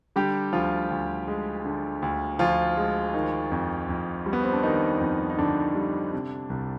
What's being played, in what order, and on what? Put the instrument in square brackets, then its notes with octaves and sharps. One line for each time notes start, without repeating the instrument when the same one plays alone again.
[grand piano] D3 G3 G4
D2 F3 F4
D2
G#3
D3
D2
D2 F3 F4
G#3
D#3
F2
F2
G3
B3
C4
D4
D#3 D#4
F2
D#4
F2 D3 D4
G3
C3
C2